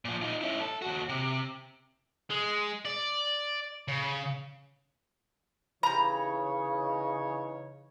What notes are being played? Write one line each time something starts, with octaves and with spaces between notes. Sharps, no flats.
A#2 F3
D#4 F4
C#4 E4
A4
D#2 F#4
C3
G#3
D5
C#3
C#3 E3 D#4 G4 C#5 A#5 B5